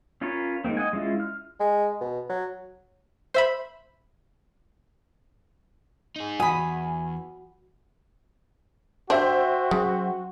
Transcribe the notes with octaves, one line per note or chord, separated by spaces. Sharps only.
C#4 F4 A#4 B4 C#5
D#3 G#3 A#3 C4
D#5 F#5 G#5
G#3 C#4 E4 F4
F6
G#3
B2
F#3
C5 E5 B5
D#4 G#4
E2 G2 F#4 G#5 B5 D#6
D4 F#4 C5 E5 G5
C#3 F#3